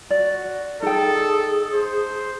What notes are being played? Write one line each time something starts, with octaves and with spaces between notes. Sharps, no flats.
F#4 D5
D#4 G#4 A4 G5
C5